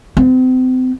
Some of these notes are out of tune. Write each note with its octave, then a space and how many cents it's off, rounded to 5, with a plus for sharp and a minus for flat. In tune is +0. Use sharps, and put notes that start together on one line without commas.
C4 -35